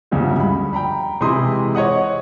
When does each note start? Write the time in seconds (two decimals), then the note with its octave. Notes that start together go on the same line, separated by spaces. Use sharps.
0.11 D2 G2 C#3 F3 G#3
0.40 B5
0.73 G5 A#5 B5
1.21 C3 E3 G#3 E4 C6 D#6
1.75 C#5 D#5 F#5 D#6